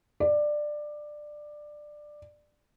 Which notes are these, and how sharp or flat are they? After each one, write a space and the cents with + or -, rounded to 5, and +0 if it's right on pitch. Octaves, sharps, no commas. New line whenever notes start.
D5 +15